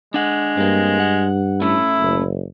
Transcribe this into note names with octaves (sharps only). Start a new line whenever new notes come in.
G#3 D4 F#5
G2 A#3 C4
F#5
A2 A3 C#4 E4
F#1